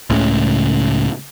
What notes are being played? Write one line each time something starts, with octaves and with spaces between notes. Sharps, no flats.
C#2 A2 C#3